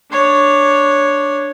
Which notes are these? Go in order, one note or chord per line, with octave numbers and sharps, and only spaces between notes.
D4 C#5